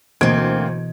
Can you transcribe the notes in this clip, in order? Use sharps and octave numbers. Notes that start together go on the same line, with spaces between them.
D2 B2 E3 A#3 C4 D#5 G#6 D7